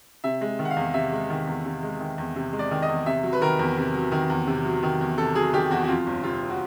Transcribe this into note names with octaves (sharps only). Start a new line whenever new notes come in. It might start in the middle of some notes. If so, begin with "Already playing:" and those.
C3 E5
G#3
D#3
F#5
F5
E2
C3 E5
G#3
D#3
E2
C3
G#3
D#3
E2
C3
G#3
D5
D#3
D#5
E2
C3 E5
F#3
B4
D#3 A#4
E2
C3
F#3
D#3
E2
C3
F#3
D#3
E2
C3 A4
F#3 G#4
D#3 G4
E2 F#4
F#4
F2 F4
G1
C3 F4
G1
F#4